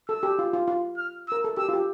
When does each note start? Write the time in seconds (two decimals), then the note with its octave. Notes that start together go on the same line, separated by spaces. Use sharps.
0.09 A4 E6
0.23 G4
0.39 F4
0.53 F4
0.68 F4
0.98 F6
1.28 A#4 E6
1.44 A4
1.57 G4 E6
1.69 F4
1.73 G4